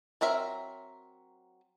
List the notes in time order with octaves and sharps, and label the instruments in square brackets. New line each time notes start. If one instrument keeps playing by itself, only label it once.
[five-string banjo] F#3 C4 A#4 E5